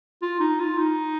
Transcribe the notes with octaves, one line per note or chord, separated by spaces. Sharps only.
F4
D#4
F4
D#4